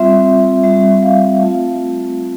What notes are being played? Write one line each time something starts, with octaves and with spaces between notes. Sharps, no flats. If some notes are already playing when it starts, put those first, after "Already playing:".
Already playing: G3 C4 F4 E5
G3 C4 F4 E5
F5
A3 C4 F4